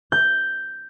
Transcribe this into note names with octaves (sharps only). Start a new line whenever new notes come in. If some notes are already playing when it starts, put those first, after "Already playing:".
G6